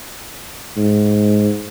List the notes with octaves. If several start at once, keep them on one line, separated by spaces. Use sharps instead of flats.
G#2